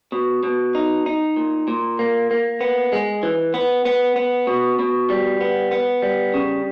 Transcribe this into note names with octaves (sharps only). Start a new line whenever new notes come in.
B2
B2
D#4
D#4
A#2
A#2
A#3
A#3
B3
G#3
E3
B3
B3
B3
B2
B2
G3
B3
B3
G3
C#3